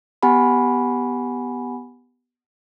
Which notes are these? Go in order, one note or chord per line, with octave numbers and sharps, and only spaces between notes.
B3 G4 F#5 G#5 B5